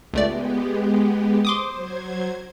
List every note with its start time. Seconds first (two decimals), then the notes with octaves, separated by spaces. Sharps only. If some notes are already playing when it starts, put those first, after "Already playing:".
0.14 C#2 G#3 A3 B3 G4 D5
1.45 C5 C6 D6 D#6
1.73 F#3 C5 G#6